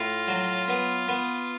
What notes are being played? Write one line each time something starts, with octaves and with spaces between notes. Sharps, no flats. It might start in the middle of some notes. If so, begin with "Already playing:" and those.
Already playing: A2 F4
F#3
B3
B3